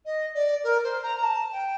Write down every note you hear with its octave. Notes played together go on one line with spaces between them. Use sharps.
D#5
D5
A#4
C5
A#5
A#5
A5
G5